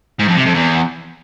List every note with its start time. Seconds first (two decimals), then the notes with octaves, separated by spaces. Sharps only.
0.19 G#2
0.28 F2
0.37 C3
0.45 F2
0.54 E2